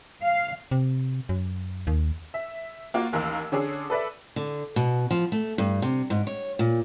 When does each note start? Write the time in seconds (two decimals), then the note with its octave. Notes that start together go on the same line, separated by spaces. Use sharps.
0.22 F5
0.71 C3
1.29 F#2
1.87 D#2
2.34 E5
2.94 A#3 F4 F#4
3.12 A1 D#2 A#4 F5 E6
3.52 D3 C#4 D4 G#4 A4
3.90 A4 B4 D5 E5
4.36 D3
4.76 B2
5.11 F3
5.32 A3
5.58 G2
5.82 C3
6.10 G#2
6.27 C#5
6.59 A#2